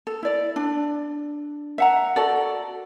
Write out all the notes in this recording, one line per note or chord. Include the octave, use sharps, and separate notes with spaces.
A4
E4 D5
D4
E5 F#5 A#5
F#4 A4 D5